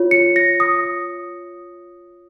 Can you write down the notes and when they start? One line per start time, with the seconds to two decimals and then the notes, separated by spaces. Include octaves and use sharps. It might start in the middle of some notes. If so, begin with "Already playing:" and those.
Already playing: F4 C#5
0.11 C#7
0.36 A#6
0.60 D#6